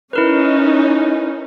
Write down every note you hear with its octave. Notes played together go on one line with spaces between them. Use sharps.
C#4 D#4 E4 A#4 B4